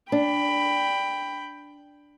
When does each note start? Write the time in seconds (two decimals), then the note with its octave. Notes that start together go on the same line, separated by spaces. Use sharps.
0.12 D4 G5 B5